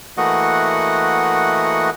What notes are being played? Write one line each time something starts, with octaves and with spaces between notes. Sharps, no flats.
E3 A3 A#3 F#4 D#5 F#5